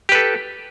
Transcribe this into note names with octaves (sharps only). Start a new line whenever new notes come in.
G4 A4 B4